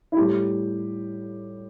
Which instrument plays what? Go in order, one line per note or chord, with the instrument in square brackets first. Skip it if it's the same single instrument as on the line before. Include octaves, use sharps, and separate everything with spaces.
[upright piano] E4
A2 G3 G4